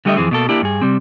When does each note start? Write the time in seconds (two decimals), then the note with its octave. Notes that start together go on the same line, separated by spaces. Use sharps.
0.05 D3 G3 A3 G4 D#5 E5
0.17 F2 C#3 E3 C4 G#4
0.31 B2 A#3 A4
0.49 A#3 D4 E4 G4
0.62 G2 G#4
0.82 C3 G3 C4